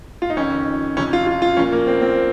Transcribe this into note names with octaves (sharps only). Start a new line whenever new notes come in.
F4
D#4
F2 D#3 C#4
F2 C3 F3 C#4
F4
F4
F4
A#2 F3 C#4
A#3
C4
C4